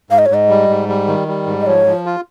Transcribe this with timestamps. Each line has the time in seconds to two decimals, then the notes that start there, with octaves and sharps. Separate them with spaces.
0.10 G#2 F5
0.18 D#5
0.26 C#5
0.30 G#2 D#5
0.49 G3
0.69 G#2
0.89 G3
1.08 D#3
1.28 G3
1.47 G#2
1.61 D#5
1.67 F3 C#5
1.86 F3
2.06 F4